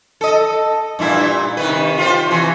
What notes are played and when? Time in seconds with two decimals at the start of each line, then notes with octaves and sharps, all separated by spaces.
0.21 A4 D#5
0.99 G2 A#2 E4
1.57 C3 D#3 B4
1.98 F4 G4 C5
2.26 C3 E3